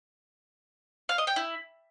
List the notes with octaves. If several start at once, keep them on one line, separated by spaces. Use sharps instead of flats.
F5
D#5
G5
E4